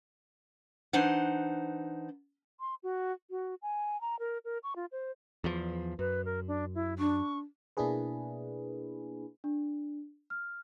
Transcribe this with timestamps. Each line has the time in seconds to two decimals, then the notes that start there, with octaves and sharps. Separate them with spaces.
0.93 E3 D4 D#4 C5 F#5
2.60 C6
2.83 F#4
3.30 F#4
3.62 G#5
4.01 A#5
4.20 A#4
4.45 A#4
4.63 C#6
4.76 F4
4.92 C5
5.44 E2 F3
5.99 F#2 B4
6.25 A#4
6.48 D4
6.75 E4
6.99 D4 C#6
7.77 B2 A#3 D4 E4 G#4 B4
9.44 D4
10.30 F6